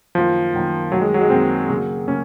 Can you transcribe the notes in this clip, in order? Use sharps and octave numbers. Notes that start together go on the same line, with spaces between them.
F#2 D#3 F3 A#3
F#2 D#3 A#3
F#2 D#3 F#3 A#3
G#3
F#3
G#3
F#2 D#3 A#3 C4
C#3 F#3 A#3
C#3 F#3 A#3 C#4